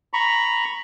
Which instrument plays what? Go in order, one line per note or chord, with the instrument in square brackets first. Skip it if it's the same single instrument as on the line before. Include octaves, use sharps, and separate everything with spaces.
[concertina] A#5 B5 C#6